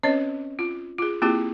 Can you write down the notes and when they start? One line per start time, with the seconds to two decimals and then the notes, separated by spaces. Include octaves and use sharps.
0.03 C4 C#4 B4 C#5 D#5
0.59 F4
0.98 F4 G#4
1.22 A#3 C4 E4 F4 G4 G#4